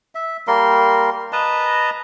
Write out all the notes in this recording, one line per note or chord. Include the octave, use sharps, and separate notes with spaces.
E5
G3 A#3 A#4 C6
B4 D#5 A5 A#5